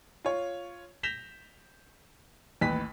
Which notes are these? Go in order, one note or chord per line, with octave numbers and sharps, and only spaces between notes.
F4 C#5
G6 A#6 B6 E7 F7 G7
A1 D#2 B4 B5 B6